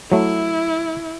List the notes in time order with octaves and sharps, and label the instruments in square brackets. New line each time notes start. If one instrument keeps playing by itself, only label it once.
[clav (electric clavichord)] F#3 A3 [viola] E4